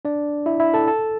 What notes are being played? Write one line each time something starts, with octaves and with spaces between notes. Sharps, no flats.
D4 D5
E4 E5
E4 E5
A4 A5
A4 A5